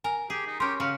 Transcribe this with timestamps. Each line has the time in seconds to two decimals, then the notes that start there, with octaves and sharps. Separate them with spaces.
0.04 A#4 G#5
0.30 G4 G#4
0.47 D#4
0.60 C#4 G4 A#4 C6 G6
0.80 C#3 F#4 F5